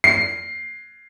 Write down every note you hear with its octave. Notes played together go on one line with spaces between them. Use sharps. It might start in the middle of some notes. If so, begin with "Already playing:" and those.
C7